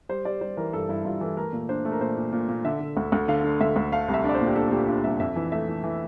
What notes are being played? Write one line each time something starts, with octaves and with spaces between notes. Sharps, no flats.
G3 C5
G3 D5
G3 C5
E3 A#4
G2 A4
G2 E4
G2 F4
E3 A4
A3 A#4
A#2
D4 C5
A3
A#4
A#2 C5
A#2
A#2
A#2
D3 E5
D3
D2
D2
D3 F5
D3
D2 E5
D2
A3 F5
C2
E5
D4 D5
C5
A#2
G4
D4 A4
A4
A#2 G4
D4 F4
C2 E5
F2 E5
E3
A3 E5
E3
E3